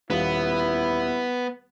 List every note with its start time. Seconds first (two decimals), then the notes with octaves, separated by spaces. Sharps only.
0.10 D#1 B3 E4 F5